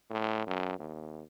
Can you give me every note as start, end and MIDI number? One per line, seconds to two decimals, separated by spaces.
0.10 0.47 45
0.47 0.76 42
0.79 1.22 39